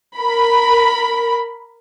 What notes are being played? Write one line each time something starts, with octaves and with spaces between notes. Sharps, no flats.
A#4 B5